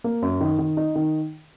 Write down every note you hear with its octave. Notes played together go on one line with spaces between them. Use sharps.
A#3
F#2
D#3
D#3
D#4
D#3